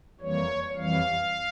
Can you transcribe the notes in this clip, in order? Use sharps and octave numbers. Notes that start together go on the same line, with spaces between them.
F2 E3 G3 A#3 C#5
F2 E3 G3 F5